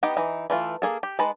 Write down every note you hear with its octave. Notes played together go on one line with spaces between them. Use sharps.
B3 D#4 G4 D#5 G5
E3 D#4
E3 A3 F4
A#3 G#4 A4
G4
G#3 D#4 B4 A5